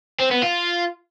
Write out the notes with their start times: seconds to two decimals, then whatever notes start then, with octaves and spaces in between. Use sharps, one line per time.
0.20 C4
0.31 B3
0.42 F4